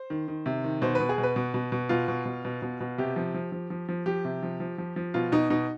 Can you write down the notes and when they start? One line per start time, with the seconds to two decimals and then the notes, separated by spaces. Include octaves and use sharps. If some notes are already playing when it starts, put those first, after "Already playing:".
Already playing: C5
0.10 D#3
0.28 D#3
0.46 C3
0.64 D#3
0.82 B2 C5
0.95 B2 B4
1.09 G#4
1.18 B2
1.23 B4
1.36 B2
1.54 B2
1.72 B2
1.89 B2 F4
2.08 B2
2.25 B2
2.45 B2
2.62 B2
2.80 B2
2.98 C3 G4
3.16 F3
3.34 F3
3.52 F3
3.70 F3
3.89 F3
4.06 F3 G4
4.25 C3
4.43 F3
4.60 F3
4.78 F3
4.96 F3
5.14 B2 F4
5.32 B2 D#4
5.50 B2 D#4